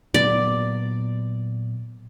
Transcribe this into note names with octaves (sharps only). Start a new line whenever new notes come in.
A#2 F#3 B3 D5